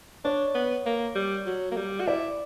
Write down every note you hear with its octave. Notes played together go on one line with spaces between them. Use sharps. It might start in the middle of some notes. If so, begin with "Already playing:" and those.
D4 C#5
B3
A#3
G3
F#3
A#3
G3
F#4
E4 D5